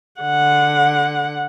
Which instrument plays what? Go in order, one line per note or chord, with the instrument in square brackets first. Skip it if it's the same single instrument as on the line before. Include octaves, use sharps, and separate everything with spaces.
[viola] D3 F#5